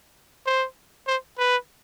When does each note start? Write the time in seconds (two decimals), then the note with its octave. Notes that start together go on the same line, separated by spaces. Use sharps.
0.46 C5
1.07 C5
1.38 B4